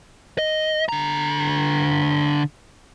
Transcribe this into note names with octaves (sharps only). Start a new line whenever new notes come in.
D#5
D3 A#5